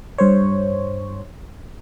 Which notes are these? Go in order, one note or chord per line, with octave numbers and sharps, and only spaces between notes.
G2 C5 C#5